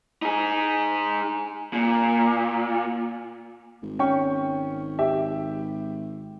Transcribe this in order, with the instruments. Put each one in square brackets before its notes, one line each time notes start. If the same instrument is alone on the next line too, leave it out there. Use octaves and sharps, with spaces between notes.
[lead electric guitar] D#4 G#4
A#2
[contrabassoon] G#1
[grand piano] C#4 G5 C#6
G4 E5